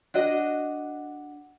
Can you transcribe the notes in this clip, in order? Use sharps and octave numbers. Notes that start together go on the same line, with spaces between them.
D4 F#4 D#5